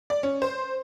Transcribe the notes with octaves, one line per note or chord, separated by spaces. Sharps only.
D5
C#4
C5